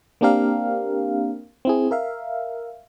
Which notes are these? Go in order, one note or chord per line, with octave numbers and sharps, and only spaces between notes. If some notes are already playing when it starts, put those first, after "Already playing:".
A#3 C4 D4 G4 A#4 F5
C4 E4 G#4
A#4 E5 F5